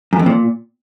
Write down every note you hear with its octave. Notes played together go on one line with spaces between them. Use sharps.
F#2
F2
A#2